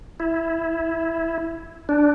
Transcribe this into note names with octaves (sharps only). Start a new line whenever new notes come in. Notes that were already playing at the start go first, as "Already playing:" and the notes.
E4
D4